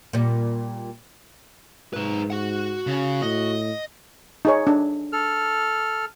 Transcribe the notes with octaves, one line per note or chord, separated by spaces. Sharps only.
A#2 G3
G#2 D#4 B4
F#4 F#5
C#3
A2 D#5
D#4 G#4 C#5
D4
A4 F6